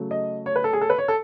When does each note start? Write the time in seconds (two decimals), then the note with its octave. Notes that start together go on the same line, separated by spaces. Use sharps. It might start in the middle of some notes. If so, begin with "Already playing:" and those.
Already playing: C#3 F#3 A3
0.11 D#5
0.46 C#5
0.56 B4
0.64 A4
0.73 G#4
0.81 A4
0.90 B4
0.98 C#5
1.08 A4